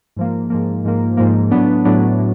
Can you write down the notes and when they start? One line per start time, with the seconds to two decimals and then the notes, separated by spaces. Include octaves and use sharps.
0.16 G#2 F3 A#3
0.50 G#2 F3 A#3
0.85 G#2 F3 A#3
1.17 G#2 F3 A#3
1.51 A2 F#3 B3 D4
1.85 A2 F#3 B3 D4
2.19 A2